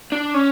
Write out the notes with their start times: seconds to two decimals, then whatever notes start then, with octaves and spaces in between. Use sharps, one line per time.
0.12 D4
0.34 C#4